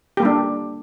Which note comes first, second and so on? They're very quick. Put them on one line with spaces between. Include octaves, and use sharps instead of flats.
G4 A#3 G3 D4